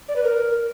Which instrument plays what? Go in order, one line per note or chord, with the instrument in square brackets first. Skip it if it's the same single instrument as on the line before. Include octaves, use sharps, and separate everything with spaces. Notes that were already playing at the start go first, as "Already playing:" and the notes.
[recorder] D5
B4
A#4